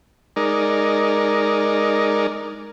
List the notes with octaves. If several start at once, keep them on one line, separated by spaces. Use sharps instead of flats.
G#3 D#4 A#4 D5